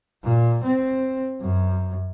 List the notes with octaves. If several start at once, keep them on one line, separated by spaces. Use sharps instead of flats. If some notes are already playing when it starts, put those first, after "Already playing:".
A#2
C4
F#2